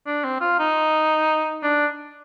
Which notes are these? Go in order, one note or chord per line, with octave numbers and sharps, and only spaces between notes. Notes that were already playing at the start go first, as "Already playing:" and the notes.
D4
C4
F4
D#4
D4